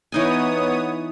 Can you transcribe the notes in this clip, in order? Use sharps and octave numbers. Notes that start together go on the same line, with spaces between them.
E3 B3 D#4 C#5 G#5 D#6